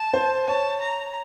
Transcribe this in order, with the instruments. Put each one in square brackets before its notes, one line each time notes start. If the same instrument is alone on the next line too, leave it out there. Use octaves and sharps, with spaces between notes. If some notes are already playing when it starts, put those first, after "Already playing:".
Already playing: [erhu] A5
[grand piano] C5
[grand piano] C#5 [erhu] A5
[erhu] A#5